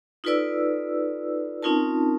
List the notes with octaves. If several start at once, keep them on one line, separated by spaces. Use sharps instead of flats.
D#4 F4 A4 B4 D5 E6
C4 C#4 D#4 F4 A#4 A5